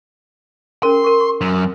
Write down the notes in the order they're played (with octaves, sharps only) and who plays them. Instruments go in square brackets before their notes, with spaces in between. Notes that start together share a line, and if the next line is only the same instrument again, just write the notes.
[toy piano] C#4 G#4 A#4 [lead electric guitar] C6
[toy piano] A#4 C#6
C#6
[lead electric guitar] F#2